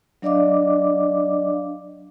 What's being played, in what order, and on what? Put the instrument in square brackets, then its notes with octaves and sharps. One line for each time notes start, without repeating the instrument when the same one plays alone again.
[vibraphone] F#3 D4 D5 D#5 F5 D6